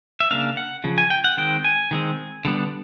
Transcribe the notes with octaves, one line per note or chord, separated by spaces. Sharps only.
E5
C#3 F3 A#3 D4 F5
F#5
C#3 F3
G#5
G5
F#5
D#3 G#3 C4 G5
G#5
D#3 G#3 C4
D3 G3 B3 D4